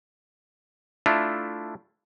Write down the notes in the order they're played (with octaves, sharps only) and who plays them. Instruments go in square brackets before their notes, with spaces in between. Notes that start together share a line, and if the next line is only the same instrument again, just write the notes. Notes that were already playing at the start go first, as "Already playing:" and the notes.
[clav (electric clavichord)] A3 D4 E4 F4